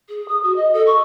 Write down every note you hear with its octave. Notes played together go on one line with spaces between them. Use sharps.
G#4
D#6
F#4
D#5
A4
C#6